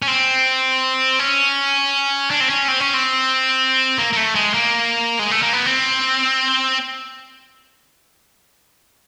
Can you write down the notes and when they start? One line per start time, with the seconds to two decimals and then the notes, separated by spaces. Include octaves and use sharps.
0.02 C#4
0.08 C4
1.19 C#4
2.31 D4
2.40 C4
2.50 C#4
2.68 C4
2.80 C#4
2.94 C4
3.98 A#3
4.13 A#3
4.17 A3
4.35 G#3
4.54 A#3
5.19 G#3
5.31 A3
5.42 A#3
5.53 B3
5.66 C4